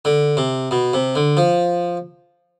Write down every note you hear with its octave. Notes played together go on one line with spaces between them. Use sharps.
D3
C3
B2
C3
D3
F3